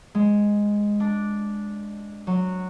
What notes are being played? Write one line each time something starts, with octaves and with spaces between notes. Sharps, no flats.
G#3
D4
F#3